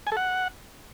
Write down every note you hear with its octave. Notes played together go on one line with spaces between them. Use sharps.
G#5
A4
F#5